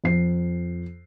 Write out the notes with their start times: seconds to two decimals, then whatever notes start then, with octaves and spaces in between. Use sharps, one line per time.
0.04 F2 C7